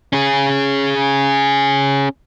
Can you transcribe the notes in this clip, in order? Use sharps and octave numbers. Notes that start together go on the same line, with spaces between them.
C#4 G#4